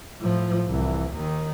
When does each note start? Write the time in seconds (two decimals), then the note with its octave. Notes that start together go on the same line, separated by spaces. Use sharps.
0.21 A2 F3
0.68 C2 E3
1.13 D#2 D#3